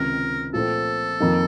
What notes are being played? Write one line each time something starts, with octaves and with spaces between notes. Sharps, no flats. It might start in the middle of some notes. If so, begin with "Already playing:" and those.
Already playing: C#2 C3 D#3 A#4
A#2 F3 A3 C4 A4
F2 D#3 A#3 D#4 A#4